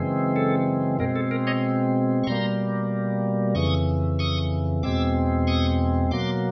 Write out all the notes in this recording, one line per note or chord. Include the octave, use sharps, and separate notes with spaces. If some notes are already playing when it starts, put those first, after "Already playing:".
Already playing: F#2 C#3 E3 G#3 C4
A4
B2 G#3 C4 A#4
A4
A#4
C#5 D#5
C#6
B2 G3 A#3 A#5 C6
F2 C#3 E3 C#6 D#6
C#6 D#6
E2 B2 G#3 C4 D6 E6
C#6 D#6
B2 F#3 A#3 C6 D6